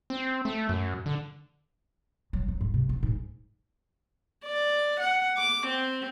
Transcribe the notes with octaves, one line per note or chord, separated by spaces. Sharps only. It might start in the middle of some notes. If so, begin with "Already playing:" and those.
C4
A3
F#2
D3
F#3
F#3
G2
C3
C4
G#2
D5
F#5
D6
C4